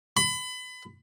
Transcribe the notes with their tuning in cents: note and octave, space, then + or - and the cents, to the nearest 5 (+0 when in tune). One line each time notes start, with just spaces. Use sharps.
B5 +30